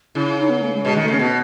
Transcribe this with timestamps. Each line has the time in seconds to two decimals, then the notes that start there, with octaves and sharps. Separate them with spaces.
0.15 C#3 E4
0.27 E4
0.38 D#4
0.50 B3
0.61 A3
0.73 G#3
0.85 B2 G#3
0.96 D#3
1.02 A3
1.08 C#3
1.14 C#4
1.19 B2 B3